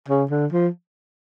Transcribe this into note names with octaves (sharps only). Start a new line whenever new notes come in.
C#3
D3
F3